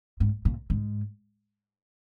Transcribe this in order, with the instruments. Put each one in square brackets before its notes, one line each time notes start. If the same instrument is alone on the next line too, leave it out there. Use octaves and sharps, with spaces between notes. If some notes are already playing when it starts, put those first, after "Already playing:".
[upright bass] G#2
A#2
G#2